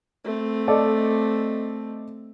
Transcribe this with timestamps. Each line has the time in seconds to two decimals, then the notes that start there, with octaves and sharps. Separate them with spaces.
0.24 A3 C4
0.68 A4 D5 D#5